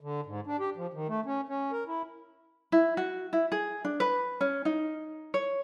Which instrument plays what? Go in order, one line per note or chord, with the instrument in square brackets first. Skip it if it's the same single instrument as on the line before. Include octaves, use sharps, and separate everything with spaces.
[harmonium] D3
G#2
D4
G4
F3
D#3
A3
C#4
C#4
A#4
E4
[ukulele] E4
F#4
E4
G#4
D4
B4
C#4
D#4
C#5